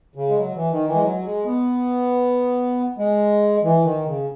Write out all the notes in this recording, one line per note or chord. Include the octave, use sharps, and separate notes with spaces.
C#3
G#3
F#3
E3
D#3
E3
G#3
F#3
G#3
B3
G#3
E3
D#3
C#3